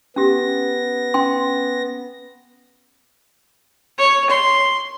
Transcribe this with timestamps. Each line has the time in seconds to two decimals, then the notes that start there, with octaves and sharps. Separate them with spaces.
0.16 B3 C#4 G4 A#6
1.14 C#4 G5 C6
3.98 C#5
4.30 C6